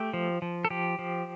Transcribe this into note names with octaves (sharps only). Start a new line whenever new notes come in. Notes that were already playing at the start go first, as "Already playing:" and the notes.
Already playing: A3 G4
F3
F3
A4
F3 G4
F3